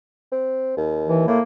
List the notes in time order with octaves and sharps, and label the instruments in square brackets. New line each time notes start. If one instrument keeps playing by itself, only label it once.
[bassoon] C4
D#2
[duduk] E3
[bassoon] A2 [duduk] A#3